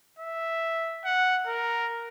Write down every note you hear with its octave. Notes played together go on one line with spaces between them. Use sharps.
E5
F#5
A#4